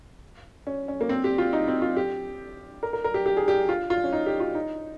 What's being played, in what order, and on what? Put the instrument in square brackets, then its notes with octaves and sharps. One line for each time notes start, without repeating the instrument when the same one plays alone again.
[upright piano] C#4
C#4
A#3
C4
G4
F4
D#4
C4
F4
G4
A#4
A#4
A#4
G4
G4
G#4
G4
F4
F4
C#4
D#4
G4
F4
D#4